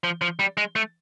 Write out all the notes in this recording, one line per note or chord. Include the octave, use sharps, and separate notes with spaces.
F3
F3
G3
G#3
A3